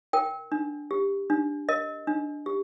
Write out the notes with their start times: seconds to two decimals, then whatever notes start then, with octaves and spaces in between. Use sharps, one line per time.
0.13 A#4 G5
0.52 D4
0.91 G4
1.30 D4
1.69 A#4 D#5
2.07 D4
2.46 G4